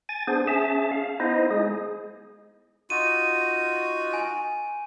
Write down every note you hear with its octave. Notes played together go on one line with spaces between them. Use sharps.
G#5 A6
B3 D4 G#4 C5
C#4 G#4 E5 A5
F5
B3 D#4 E4 C5 D#5
G#3 G#4
D#4 F4 F#4 D#7
G#5